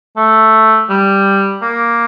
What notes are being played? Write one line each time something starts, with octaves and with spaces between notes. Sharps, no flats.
A3
G3
A#3